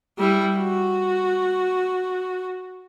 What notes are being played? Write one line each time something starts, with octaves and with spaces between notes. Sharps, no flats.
G3 E4
F#4